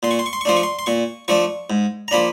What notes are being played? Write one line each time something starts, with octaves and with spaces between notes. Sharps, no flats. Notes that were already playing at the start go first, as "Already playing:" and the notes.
A#2 C6
C#6
C6
C#6
C6
C#6
F3 A3 D4 C6
C#6
C6
C6
A#2 C#6
F3 A3 D4 C#6
G#2
A#5
F3 A#3 D4 B5